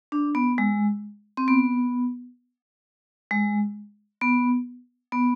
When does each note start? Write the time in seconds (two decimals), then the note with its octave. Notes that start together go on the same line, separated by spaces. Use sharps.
0.12 D4
0.35 B3
0.58 G#3
1.37 C4
1.48 B3
3.31 G#3
4.21 B3
5.12 B3